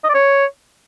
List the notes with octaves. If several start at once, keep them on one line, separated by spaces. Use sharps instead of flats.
D#5
D5
C#5